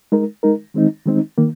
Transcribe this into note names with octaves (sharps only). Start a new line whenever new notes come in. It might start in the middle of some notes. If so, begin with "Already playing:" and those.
G#3 D#4 A#4
G#3 D#4 A#4
D#3 G#3 C4 D#4
D#3 G#3 C4 D#4
D#3 A#3